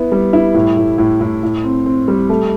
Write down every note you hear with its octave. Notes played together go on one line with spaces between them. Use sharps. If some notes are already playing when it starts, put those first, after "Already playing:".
Already playing: B3 E4
G3
E4
A2
A2
A2
A2
A2
C4
C4
G3
A3